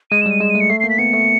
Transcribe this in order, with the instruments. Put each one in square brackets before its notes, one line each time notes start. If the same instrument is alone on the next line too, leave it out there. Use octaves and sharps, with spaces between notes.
[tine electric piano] G#3 [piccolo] D#7
[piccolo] E7
[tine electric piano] G3 [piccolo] D#7
[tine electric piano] G#3 [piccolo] E7
[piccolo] D#7
[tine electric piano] A3
[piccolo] C#7
[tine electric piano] A3 [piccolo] C7
[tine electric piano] A#3 [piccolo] C7
[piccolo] B6
[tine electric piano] B3 [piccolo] C#7
[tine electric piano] A3